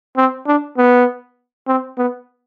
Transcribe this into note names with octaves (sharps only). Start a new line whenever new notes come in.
C4
D4
B3
C4
B3